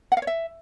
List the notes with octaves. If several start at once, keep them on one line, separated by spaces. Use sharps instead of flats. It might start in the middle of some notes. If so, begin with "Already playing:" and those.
F#5
F5
C#5
E5